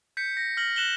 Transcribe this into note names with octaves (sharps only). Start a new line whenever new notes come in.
G6 B6 C#7
A#6
F6 A#6 F#7
F#6 E7 F#7 G7